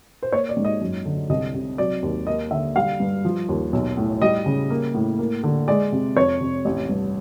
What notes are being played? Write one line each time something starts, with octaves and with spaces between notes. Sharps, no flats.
C5
A#3 C#5
D5
G#2
D#5
F#2
D3
C2 D#5
C3
F#3 D5
D#2
A#3 D#5
D3 E5
G3 F5
G2
F3
D#2
B1
A2
G3 D#5
C#3
A#3
A2
A#3
D3
G#3 D5
C3
F2 C#5
C3
A1
G2